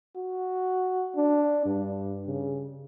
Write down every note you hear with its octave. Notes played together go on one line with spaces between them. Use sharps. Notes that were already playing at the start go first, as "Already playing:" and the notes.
F#4
D4
G2
C#3